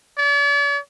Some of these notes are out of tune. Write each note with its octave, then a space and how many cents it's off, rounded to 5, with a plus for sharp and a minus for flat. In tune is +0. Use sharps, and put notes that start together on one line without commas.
D5 -45